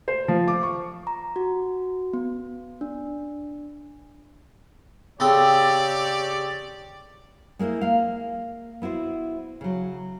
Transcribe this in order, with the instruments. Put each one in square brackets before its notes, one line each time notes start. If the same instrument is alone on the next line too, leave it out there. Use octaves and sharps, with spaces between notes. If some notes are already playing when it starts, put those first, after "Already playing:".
[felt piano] C5
F3
D6
C#6
[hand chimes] A#5
F#4
B3
D4
[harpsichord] C#3 C4 A4 [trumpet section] G4 C#5 D5
[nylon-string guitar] G#3 A#3 E4 C5 D#5
A#3 F5
B3 E4 F#4 C5
C#3 F#3